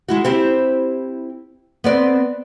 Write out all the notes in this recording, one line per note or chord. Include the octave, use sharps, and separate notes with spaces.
G#3 E4 F#4
C4 E4 G4
B3 C4 D5